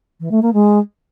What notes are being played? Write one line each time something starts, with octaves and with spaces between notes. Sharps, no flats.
E3
A3
A#3
G#3